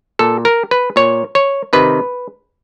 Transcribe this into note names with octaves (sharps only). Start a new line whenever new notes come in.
A#2 A4
A#4
B4
A#2 C#5
C#5
C3 D#3 B4